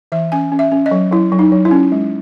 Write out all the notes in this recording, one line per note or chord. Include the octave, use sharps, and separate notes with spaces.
E3 E5
C#4 G#5
C#4
E5
C#4
D#5
F#3
F#3 E4
F#3
D#4
F#3
E4
C#4
G#3